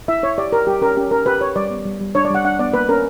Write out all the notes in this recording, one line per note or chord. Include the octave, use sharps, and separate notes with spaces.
E4 E5
E4 C#5
G4 D5
G4 A#4
G3 G4
C#4 A#4
C#4 G4
G4 A#4
G4 B4
G4 C#5
G3 D5
B3
G3
G3
D4 C#5
D5
G3 F#5
D4 F#5
B3 D5
A#3 B4
C#4 A#4